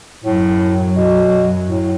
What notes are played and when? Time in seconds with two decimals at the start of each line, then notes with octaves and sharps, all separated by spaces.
0.24 F#2 A2 F#3
0.96 B2
1.68 A2